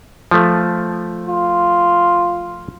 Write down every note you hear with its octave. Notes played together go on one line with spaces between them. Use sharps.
F3 A3
F4